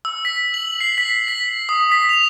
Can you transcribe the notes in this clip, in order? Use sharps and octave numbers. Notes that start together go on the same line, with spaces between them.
E6
B6
F#7
C7
B6
B6
D#6
B6
F7